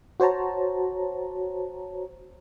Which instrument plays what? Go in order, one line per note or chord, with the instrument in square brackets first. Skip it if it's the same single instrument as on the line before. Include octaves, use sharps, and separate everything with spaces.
[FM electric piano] F#4 C5 C#5 A5 A#5